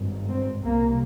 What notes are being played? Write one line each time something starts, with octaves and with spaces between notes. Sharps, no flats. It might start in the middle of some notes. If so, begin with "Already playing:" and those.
Already playing: G#1 G2
C4
C2 A#2 A#3